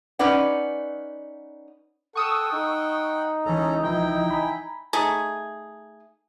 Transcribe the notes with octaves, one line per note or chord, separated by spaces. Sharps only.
C#4 D#4 B4 D5 F#5
A4 F#5 G5 C#6 D#6 E6
D#4
C#2 E3 C#4 A4 A#5
B1 F3 E4 G5 G6
G#5 A#5 B5
A3 D#4 G#4